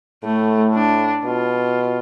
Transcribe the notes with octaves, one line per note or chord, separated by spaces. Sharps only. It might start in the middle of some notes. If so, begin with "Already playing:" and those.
A2 A3
D4
B2 F4